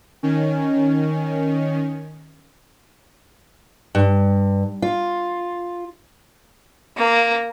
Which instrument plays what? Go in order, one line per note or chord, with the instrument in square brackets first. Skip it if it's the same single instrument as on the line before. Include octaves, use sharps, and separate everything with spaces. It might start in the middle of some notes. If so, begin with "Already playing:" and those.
[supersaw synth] D#3 C#4
[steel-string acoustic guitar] G2
F4
[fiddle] A#3